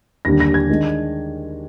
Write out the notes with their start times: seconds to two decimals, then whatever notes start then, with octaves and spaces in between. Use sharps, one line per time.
0.25 D#2 D3 G3 D4 A#6
0.40 A#6
0.54 G#6
0.70 D#3 G#3 D4